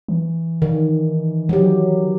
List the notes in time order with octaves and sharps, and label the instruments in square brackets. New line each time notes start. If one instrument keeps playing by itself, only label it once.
[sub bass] E3
[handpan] D#3
F#3 G4